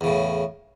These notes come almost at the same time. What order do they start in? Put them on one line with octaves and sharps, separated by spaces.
E2 C#3 A2